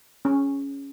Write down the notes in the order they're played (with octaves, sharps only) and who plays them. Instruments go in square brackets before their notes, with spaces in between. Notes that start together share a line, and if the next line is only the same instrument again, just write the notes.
[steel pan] C#4